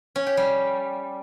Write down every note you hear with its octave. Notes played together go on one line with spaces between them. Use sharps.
C#4
G4
G3